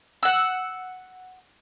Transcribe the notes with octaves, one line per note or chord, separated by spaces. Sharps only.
F#5 E6